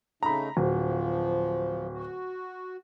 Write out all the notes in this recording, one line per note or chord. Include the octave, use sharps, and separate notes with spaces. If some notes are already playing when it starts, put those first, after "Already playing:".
C#3 A3 D#4 A#5 B5
D1 F3
F#4